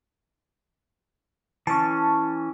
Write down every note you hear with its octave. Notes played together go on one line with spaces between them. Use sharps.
E3 C#4 A5 C#6